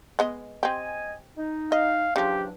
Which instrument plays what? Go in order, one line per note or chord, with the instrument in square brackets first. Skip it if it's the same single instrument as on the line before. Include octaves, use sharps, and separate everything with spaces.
[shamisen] G#3 B3 D#5
[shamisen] C4 G4 [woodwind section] D#5 G#5
[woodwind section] D#4
[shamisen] D#5 [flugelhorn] F5
[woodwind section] E2 F#3 D4 [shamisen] C#3 F3 [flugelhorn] G4